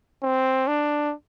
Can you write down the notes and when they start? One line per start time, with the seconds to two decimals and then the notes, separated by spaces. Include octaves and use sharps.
0.23 C4
0.67 D4